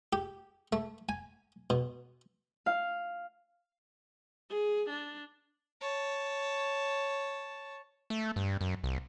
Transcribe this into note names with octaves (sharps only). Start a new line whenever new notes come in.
G4
A3
G#5
B2
F5
G#4
D4
C#5 A5
A3
G2
F#2
C2